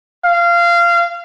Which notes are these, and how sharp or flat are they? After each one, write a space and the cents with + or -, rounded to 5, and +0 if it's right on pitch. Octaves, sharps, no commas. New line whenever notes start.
F5 -20